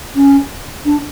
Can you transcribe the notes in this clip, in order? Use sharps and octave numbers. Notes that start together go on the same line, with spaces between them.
C#4
D4